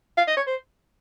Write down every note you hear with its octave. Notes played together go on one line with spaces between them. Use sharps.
F5
D#5
C#5
C5